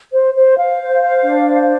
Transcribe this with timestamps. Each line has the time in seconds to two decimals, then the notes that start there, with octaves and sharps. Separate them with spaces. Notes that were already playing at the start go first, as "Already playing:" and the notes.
0.12 C5
0.34 C5
0.57 F5
0.79 C5
1.02 F5
1.23 D4
1.45 C5